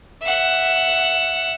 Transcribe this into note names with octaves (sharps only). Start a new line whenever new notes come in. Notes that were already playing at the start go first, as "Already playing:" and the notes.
E5 F#5